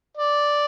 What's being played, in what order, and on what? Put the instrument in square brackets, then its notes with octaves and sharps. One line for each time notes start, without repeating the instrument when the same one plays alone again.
[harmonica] D5